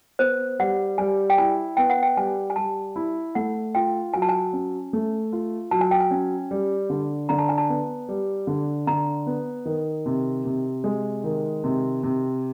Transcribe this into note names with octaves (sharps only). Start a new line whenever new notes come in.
B3 C5
G3 F#5
G3 G#5
G5
E4 G#5
B3 G5
F#5
G5
G3 G#5
G#5
G3 A5
E4
A3 F#5
F4 G5
F#3 G#5
A5
G#5
C#4
A3
F4
F#3 A5
G#5
G5
G#5
C#4
G3
D3
D3 A#5
A5
G#5
A5
B3
G3
D3
D3 A#5
B3
D#3
C3
C3
G#3
D#3
C3
C3